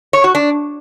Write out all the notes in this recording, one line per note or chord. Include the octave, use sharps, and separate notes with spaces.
C#5
F#4
D4